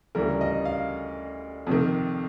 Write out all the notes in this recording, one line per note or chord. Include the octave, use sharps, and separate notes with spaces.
D2 C#3 E3 G3 A#4
D#5
F5
F2 C3 D#3